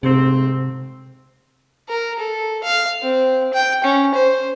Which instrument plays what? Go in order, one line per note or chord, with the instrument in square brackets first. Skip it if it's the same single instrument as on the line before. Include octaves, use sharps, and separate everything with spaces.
[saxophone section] G#2 A3 C4 [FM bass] C3
[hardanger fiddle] A#4
A4
F5
C4
G5
C#4
C5